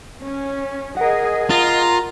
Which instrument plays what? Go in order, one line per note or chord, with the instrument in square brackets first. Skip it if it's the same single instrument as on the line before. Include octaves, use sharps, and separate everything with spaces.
[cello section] C#4
[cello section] G#4 D#5 [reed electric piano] A#4 F#5
[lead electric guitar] F4 [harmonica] A#5